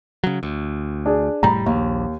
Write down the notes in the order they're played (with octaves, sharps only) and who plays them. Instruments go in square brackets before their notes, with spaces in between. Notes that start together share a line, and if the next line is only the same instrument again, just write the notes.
[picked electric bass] C#3 F#3
D2
[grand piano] D4 G#4
[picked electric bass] F1 A2 G3 [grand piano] A#5 B5
[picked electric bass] A#1 [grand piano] D#2